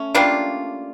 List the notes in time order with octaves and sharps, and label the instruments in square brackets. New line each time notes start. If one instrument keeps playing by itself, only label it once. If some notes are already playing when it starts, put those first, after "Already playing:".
Already playing: [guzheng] A3 C#4
[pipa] G3 A#3 D4 F4